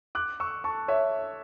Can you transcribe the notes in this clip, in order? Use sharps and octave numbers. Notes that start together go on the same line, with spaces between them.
D6 F#6
C#6 E6
A5 C#6
C#5 E5